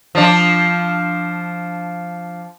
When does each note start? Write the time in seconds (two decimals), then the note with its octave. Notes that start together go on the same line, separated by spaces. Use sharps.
0.15 F3 D4